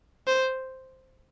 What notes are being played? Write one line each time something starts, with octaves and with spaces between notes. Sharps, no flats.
C5